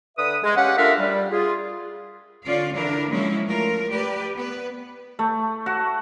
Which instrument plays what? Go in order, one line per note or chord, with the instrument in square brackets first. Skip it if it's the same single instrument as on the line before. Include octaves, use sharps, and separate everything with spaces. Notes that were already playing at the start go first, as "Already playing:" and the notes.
[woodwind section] D3 B4 E5 D#6
G#3
C#4 G4 F5 F#5
A3 D4 F4 A#4 E5 F5
G3
F4 G#4
[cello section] D3 C#4 F4 D5 F5
D3 E3 D4 E4 A#4
F3 F#3 G#3 A#3 C#4 E4
A3 F4 A#4
G4 B4 D5
B3 B4
[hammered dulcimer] A3
F#4